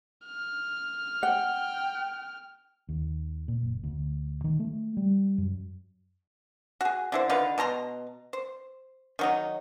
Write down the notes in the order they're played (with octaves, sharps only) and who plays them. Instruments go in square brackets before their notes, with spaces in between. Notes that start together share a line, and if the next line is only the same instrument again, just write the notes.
[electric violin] F6
[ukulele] F#5 [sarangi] G5
[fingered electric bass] D#2
A#2
F#1
D2
D#3
A3
G3
F#2
[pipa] F#4 G#4
D3 E4 C5
D3 D#3 F4 B4
B2 A5 A#5 C6
C5
D#3 F#3 D#4